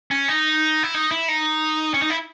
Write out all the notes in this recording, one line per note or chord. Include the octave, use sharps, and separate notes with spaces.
C#4
D#4
E4
D#4
E4
D#4
C#4
D#4
E4